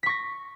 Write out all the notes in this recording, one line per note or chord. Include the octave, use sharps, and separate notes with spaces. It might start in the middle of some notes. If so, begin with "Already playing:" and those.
C#6 A#6 B6